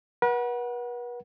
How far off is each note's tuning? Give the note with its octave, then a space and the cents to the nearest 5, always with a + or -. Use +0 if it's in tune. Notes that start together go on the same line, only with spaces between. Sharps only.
B4 -40 F#5 +0